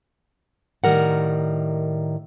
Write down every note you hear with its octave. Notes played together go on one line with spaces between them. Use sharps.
A2 D#3 G3 A#4 F#5